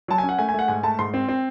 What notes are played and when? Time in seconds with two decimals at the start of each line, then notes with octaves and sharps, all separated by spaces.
0.08 F#3 A5
0.18 G#5
0.23 C#4
0.29 F#5
0.39 A3 G#5
0.49 G#5
0.54 A3 F#5
0.68 G#2 G#5
0.83 A3 A5
0.99 G#2 C6
1.14 C4
1.29 C4